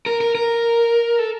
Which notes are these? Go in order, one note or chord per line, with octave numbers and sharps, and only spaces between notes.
A#4
A#4
A#4
A4